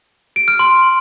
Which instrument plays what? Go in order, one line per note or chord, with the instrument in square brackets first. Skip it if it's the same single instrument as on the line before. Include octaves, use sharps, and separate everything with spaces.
[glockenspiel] D7
F6
C6